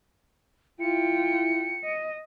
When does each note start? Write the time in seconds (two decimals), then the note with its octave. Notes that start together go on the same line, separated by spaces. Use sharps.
0.81 E4 F4 G5 C#7
1.84 D#5